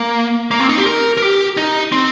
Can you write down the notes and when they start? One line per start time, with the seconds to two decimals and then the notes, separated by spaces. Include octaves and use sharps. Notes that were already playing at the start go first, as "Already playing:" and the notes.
Already playing: A#3
0.51 A#3
0.60 C4
0.69 D#4
0.78 G4
0.86 A#4
1.17 A#4
1.22 G4
1.57 D#4
1.92 C4